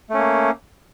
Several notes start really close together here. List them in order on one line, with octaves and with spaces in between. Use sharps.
A3 C#4 A#3